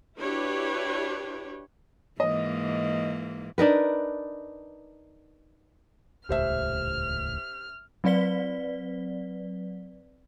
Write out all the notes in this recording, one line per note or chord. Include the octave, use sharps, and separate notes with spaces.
D4 E4 F#4 G4 B4 C#5
G#2 E3 A#3 D#5
D4 D#4 A#4 B4
D#1 C#2 A2 G4 C5 E5 F6
F#3 C4 B4 D5 B6 G7